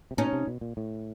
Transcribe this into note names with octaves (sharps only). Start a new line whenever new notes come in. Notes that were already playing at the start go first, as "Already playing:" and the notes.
C3
B2 C#4 D#4
C3
B2
A#2
A2